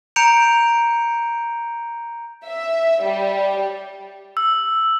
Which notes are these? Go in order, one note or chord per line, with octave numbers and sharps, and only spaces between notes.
A#5 G6 C#7 D7 F7
E5
G3
E6